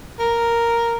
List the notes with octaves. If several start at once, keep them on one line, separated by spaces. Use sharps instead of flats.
A#4